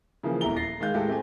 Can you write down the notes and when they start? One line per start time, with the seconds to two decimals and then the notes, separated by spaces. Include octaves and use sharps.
0.23 C#3 E3 F3 A#3
0.41 D#1 E2 A3 E4 A#5 G7
0.56 A6 A#6 C7
0.80 D#3 G#3 F5 G6
0.94 A2 G#3 E4 G4 A4
1.08 A3 C4 G4 G#5